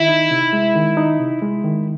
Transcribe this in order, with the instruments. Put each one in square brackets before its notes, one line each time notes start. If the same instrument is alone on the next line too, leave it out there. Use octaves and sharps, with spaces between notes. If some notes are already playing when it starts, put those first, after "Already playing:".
Already playing: [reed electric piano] D#3 [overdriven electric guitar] E4
[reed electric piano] D#4
C3
G#3
D#3
D#4
C3
G#3
D#3